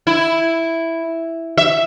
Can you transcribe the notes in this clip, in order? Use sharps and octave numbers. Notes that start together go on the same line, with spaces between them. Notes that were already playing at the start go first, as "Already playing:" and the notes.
E4
E5